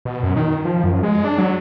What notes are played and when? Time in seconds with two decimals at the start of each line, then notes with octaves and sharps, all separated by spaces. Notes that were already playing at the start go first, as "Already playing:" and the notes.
0.05 B2
0.23 F#2
0.36 D#3
0.65 F3
0.84 F#2
1.03 G#3
1.24 D4
1.38 F#3